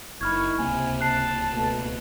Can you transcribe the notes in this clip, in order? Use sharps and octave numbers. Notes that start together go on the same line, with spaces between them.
F#1 A#3 D#4 E4 B5 C#6 F6 G#6
D1 C#2 C3 A#3 G#5
A5 F#6 C7
B2 A3